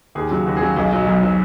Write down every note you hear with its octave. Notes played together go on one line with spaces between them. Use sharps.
D#2 G#4
C#3 F#3
D#2 F#4
G#4
C#3 F#3
B1 G#4
B2 F#3
B1
B2 F#3